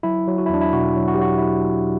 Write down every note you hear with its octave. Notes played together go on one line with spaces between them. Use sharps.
F#3 E4
F#3
F#4
E4
E2 D4
E4
B2 F#4
F#3
F#4
G4
F#3 F#4
E4